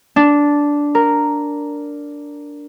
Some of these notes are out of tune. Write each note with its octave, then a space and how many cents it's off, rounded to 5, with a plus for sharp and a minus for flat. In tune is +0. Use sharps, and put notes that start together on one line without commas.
D4 -10
A#4 -5